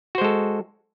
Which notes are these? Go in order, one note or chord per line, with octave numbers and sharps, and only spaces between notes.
G#3 F#4 A4 C5